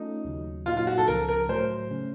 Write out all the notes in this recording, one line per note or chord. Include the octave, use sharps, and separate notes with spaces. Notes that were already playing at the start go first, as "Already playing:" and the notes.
Already playing: A3 C#4 D#4 F4 A4
D#2 C#3 F#3
A#2 F#3 A#3 D#4 F4
F4
F#4
A4
C#2 C#3 F3 A#4
A#4
A2 F#3 A3 C5
C#3 A3 C#4